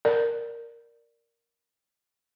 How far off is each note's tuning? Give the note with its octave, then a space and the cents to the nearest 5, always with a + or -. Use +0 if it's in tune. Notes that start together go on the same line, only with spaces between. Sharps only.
A#4 +0 D5 +0